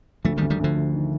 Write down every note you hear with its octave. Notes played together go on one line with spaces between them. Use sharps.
D2 F3 A3
D#3 G3
D2
D#3 G3
D2 D3 F3
D2
D#3